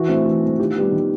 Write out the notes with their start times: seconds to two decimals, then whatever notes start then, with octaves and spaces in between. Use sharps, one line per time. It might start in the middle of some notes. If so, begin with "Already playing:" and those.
Already playing: E3 F#4
0.09 A3 C4
0.25 E3
0.42 A3 C4
0.58 D#3 F4 G4
0.75 G3 B3
0.92 D#3